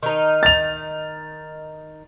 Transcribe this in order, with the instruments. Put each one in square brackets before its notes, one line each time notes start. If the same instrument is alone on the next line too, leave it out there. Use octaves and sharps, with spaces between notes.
[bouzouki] D#3 D#4
[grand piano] A6 F7